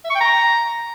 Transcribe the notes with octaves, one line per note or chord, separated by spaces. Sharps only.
E5
C#6
G5
A#5